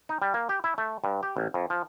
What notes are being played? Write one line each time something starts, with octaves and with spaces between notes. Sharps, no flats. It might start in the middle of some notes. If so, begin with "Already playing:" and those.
D#4
G3
A#3
G4
E4
A3
G2
G4
A1
F2
F3